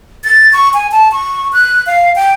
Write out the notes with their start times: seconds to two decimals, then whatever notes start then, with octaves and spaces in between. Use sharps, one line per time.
0.24 A6
0.53 C#6
0.74 G#5
0.92 A5
1.12 C#6
1.53 F#6
1.86 F5
2.16 G5